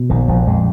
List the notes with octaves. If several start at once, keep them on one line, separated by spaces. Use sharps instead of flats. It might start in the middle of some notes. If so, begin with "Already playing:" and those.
Already playing: B2
A#1 D#3
A#1 F3
F2 G#3